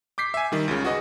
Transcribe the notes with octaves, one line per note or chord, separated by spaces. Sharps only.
D6 G6 B6 C7
E5 G#5
D#3 G3
C#2 C#3
F#4 G#4 B4 D#5